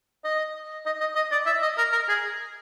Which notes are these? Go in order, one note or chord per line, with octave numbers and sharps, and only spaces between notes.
D#5
D#5
D#5
D#5
D5
E5
D#5
A#4
A#4
G#4